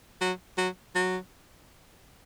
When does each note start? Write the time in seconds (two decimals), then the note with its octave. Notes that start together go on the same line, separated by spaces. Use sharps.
0.21 F#3
0.58 F#3
0.95 F#3